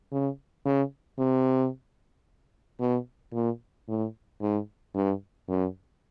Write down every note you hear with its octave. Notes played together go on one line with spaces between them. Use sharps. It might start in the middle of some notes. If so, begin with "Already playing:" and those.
C#3
C#3
C3
B2
A#2
A2
G#2
G2
F#2